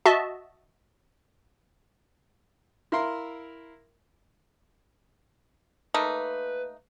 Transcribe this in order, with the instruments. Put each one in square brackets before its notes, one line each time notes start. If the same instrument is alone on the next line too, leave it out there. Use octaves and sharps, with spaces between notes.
[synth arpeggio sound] F#4 D#5 E5 A5
[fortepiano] E4 A#4 E5 F5 A#5 C6
[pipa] A3 A#3 D#4 [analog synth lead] B4